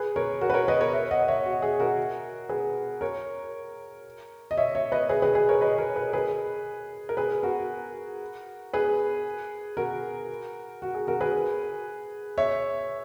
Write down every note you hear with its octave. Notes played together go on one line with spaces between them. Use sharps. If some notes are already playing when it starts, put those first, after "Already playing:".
Already playing: G#4 B4
A#4 C#5
F#4 A#4
B4
A#4 C#5
B4 D#5
A#4 C#5
C#5 E5
D#5 F#5
C#5 E5
F#4
G#4
F#4 A#4
G#4 B4
A#4 C#5
D#5
C#5 E5
C#5 E5
B4 D#5
G#4 B4
G#4 B4
G#4 B4
A#4 C#5
B4 D#5
A#4 C#5
G#4 B4
G#4 B4
A#4
G#4 B4
F#4 A#4
G#4 B4
F#4 A#4
F#4
G#4
F#4 A#4
G#4 B4
C#5 E5